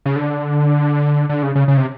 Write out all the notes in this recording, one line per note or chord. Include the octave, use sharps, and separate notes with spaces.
C#3
D3
D3
C#3
C#3
C#3
C3